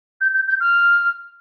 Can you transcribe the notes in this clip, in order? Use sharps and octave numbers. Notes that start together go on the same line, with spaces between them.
G6
G6
G6
F6